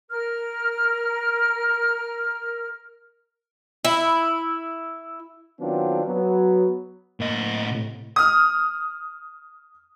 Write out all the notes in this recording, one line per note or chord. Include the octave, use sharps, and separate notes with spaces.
A#4 F6
E4
D#3 F#3 B3 C4 D4 F4
F#3 B3
A2 A#3 D#5
A2 C3
D#6 F6